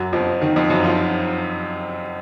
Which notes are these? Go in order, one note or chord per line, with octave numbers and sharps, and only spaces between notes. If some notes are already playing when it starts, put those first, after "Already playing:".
Already playing: F#2 F#3
F2 F3
D#3
F2 F3
F#2 F#3
F3 F4